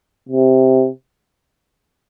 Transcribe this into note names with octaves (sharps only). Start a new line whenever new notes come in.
C3